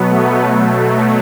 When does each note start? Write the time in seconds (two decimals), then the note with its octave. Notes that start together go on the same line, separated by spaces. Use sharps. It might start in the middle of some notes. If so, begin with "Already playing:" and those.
Already playing: B2 F#3 B3
0.09 A3
0.43 B2 F#3